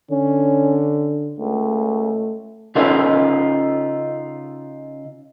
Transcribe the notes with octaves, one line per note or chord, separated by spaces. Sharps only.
D3 C#4
C#2 A3
C#3 C#4 D#4 F4 A4 B4